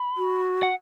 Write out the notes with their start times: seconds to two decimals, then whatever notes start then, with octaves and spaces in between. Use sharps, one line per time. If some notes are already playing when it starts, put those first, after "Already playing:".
Already playing: B5
0.17 F#4
0.63 F#5